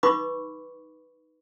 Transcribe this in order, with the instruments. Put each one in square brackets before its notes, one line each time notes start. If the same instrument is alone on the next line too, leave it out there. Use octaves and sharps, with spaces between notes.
[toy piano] D#4 B4 B5 C#6 D6